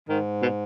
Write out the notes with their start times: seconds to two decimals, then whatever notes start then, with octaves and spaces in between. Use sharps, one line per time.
0.09 G#2 D#3
0.42 B2